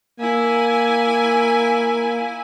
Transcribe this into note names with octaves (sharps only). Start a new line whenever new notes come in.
A#3 E4 G#5